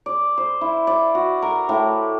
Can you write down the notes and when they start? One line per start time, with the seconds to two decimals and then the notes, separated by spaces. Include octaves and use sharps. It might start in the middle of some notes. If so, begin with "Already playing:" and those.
0.06 D5
0.38 C5
0.61 E4
0.87 D5
1.15 F#4
1.42 A#4
1.69 A2